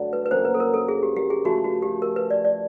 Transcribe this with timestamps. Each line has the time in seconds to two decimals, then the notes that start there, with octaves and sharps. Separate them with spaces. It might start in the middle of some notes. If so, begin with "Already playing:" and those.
Already playing: G2 D3 F#3 A3
0.13 B4
0.26 B4
0.31 F#2 C#3 F#3 A#3 C5
0.45 B4
0.54 A4
0.60 A#4
0.74 A4
0.89 G#4
1.03 G4
1.16 G4
1.30 G#4
1.44 C#3 F3 A3 F#4
1.64 F#4
1.82 G4
2.02 A#4
2.16 B4
2.30 D5
2.45 D5